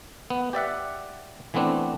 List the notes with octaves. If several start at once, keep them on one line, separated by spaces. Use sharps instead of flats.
B3
G4 D5 E5 F#5
E3 A3 B3 C4 D4